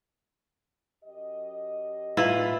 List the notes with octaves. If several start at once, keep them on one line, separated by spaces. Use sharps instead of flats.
F#2 G4 D#5
A2 E4 F4 B4